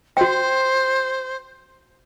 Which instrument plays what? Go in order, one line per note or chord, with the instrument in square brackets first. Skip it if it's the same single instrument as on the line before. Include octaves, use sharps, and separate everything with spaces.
[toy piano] F#4 G5 [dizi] C5